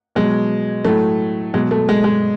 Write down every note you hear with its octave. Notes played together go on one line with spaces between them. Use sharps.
B2 F#3 G#3
A2 F#3 A3
B2 F#3 G#3
A3
G#3
G#3